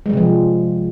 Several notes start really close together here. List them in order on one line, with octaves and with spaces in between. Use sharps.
G#3 G3 C3 F3